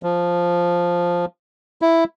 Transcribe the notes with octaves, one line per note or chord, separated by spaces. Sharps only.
F3
E4